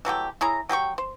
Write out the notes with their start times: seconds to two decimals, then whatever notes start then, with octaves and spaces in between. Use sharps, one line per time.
0.05 E3 F#3 A3 G4
0.41 E4 G#4 C#5 A#5
0.69 F#3 G4 G5 C#6
0.98 C5